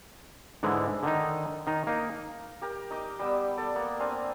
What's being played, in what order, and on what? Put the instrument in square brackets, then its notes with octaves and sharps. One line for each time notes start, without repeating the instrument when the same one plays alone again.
[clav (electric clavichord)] G#2 D3 E3 G#3
D3 D#3 D#4
D#3 D#4
A#3 D#4
[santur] G4 A#4 A#5
D#4 D#5 D6
G3 B3 E6
A4 D5
A#3 B3
C4 D4 F5 G#5